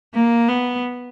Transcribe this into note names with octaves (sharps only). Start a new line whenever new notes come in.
A#3
B3